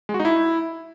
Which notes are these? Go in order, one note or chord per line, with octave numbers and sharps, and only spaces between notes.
G#3
F#4
D#4
E4